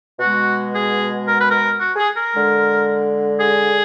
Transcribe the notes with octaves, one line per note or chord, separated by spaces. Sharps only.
B2 G#3 F#4
G#4
A#4
B4
A#4
F#4
G#4
A#4
D3 G#3
G#4